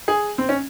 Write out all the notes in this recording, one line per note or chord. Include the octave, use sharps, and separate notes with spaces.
G#4
C4
C#4